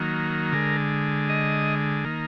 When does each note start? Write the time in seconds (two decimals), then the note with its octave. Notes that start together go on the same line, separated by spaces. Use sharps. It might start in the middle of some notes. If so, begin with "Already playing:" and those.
Already playing: D#3 F#3 A#3
0.53 D3 G#3 A#4
1.29 D#5
2.05 D#3 A#3